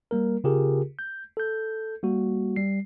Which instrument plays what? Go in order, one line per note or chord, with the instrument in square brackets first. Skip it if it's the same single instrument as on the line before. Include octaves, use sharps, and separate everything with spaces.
[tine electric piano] G3 A#3 A#4
C#3 F4 G4 G#4 A#4
G6
A4 G6
G3 A#3 F#4
G3 C7